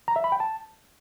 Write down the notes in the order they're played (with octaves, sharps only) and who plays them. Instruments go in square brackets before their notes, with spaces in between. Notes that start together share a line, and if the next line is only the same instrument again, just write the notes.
[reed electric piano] A#5
E5
B5
G5
A5